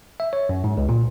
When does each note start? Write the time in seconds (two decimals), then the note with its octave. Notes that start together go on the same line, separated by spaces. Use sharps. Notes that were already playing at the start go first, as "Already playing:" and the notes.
0.20 E5
0.33 C#5
0.49 F#2
0.64 G#2
0.77 C#2
0.89 A#2